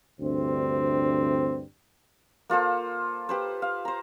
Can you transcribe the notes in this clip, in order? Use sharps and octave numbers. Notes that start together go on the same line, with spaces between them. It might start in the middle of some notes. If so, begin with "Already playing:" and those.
D2 G2 C3 C4
A#3 F4 A4 C5
G4 B4 C5
F5
C5 A#5